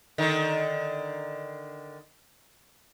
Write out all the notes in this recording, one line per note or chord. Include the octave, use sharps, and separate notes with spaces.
D3 D#3